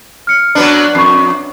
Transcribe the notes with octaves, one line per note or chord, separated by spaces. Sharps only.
F6 C#7
F#3 B3 D4
F2 C#6 C7